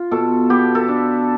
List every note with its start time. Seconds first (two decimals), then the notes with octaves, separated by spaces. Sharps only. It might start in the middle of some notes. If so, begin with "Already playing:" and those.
Already playing: F4
0.11 B2 A4
0.50 B3 G4
0.75 A4
0.88 D4